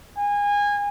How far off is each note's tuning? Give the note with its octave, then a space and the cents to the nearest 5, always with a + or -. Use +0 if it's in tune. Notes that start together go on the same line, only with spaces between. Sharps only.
G#5 -25